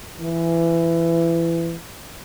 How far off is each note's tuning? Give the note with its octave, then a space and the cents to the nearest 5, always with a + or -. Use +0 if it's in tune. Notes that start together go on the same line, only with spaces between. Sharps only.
E3 +20